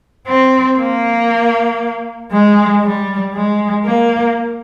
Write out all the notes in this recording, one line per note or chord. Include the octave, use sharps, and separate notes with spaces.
C4
A#3
G#3
G3
G#3
A#3